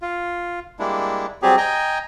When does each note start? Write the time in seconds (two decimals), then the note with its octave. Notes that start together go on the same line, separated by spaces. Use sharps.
0.02 F4
0.79 G3 G#3 A#3 D4 E4
1.42 F#3 G3 C4 G4 G#4
1.57 D#5 G5 G#5 A#5